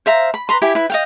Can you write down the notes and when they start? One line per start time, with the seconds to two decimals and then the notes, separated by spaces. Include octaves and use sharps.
0.06 C5 E5 F5 A#5
0.34 B5
0.49 B4 A#5 C6
0.62 E4 G4 G5 G#5
0.75 E4 B4
0.90 D#5 F5 G5